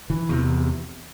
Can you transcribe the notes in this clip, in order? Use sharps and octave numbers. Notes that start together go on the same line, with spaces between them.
E3
E2 C3